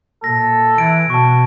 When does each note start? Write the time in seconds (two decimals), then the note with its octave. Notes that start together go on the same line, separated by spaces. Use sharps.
0.24 A#2 A4 A#6
0.78 E3 G#6 D7
1.10 B2 A5 C#6